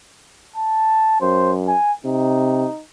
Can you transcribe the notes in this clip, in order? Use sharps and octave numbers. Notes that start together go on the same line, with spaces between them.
A5
F#2 C5
G#5
C3 D#4